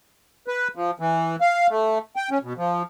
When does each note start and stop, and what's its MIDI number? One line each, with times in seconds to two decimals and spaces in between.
0.48 0.68 71
0.76 0.91 53
0.99 1.36 52
1.41 1.67 77
1.70 1.98 57
2.16 2.30 79
2.31 2.38 61
2.43 2.53 47
2.57 2.83 53